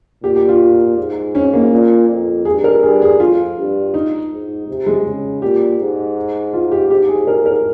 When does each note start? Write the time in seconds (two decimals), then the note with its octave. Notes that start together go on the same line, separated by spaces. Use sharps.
0.23 A#2 G4
0.36 G4
0.49 F4
0.98 G#2
1.35 C#4
1.54 A#3
1.72 A#2
2.08 F2
2.45 G2 G#4
2.64 A#4
2.83 G2 G#4
3.02 G#4
3.19 F2 F4
3.57 G2
3.94 D#4
4.32 G#2
4.68 C3
4.86 G#3
5.05 C#3
5.42 A#2 G4
5.79 G#2
6.54 F4
6.72 G4
6.90 G#2 G4
7.08 G#4
7.27 A#4
7.46 A#4